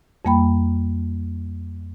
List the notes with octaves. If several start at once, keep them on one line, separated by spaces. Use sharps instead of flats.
F2 G3 A#3 G5 B5